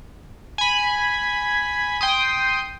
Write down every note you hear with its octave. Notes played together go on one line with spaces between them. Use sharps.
G#5 B5
G5 C6 D#6